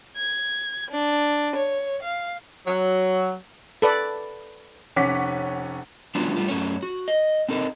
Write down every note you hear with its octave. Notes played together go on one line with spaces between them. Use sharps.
G#6
D4
C#5
F5
F#3
A4 B4 D5
F1 C#4 F#5 D6 B6
F#3 G#3 B3 C#4 D4 F4
G3 A3 F4
F#2 A3 C#4 C#5
F#4
D#5
C4 D#4 A4 A#4 D#5